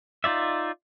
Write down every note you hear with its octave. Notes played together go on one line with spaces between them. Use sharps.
D#4 F4 D5 E5